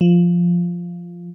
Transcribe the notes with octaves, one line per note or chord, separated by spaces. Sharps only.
F3